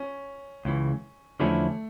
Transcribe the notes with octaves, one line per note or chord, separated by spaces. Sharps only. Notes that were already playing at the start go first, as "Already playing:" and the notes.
Already playing: C#4
C#2 C#3 E3
E2 D3 F3 A3 C#4 E4